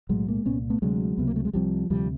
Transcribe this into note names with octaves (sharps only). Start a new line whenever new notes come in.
B1 A2 F#3 G#3
G#3 A#3
C2 A#2 B3 C#4
A3 B3
D2 C3 F#3 G#3
C#2 C3 B3
A#3
A3
G#3
C2 C3 F3 G3
D2 C3 F3 G3